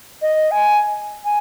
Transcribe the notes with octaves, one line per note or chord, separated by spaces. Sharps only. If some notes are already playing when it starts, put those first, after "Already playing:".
D#5
G#5
G#5